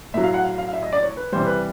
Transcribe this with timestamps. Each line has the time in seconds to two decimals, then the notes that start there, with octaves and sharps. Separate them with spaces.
0.14 A2 F#3 E5
0.24 F5
0.34 F#5
0.44 F5
0.58 F5
0.68 F5
0.73 E5
0.83 D#5
0.93 D5
1.03 C#5
1.17 B4
1.32 C3 E3 G3 C5
1.47 B4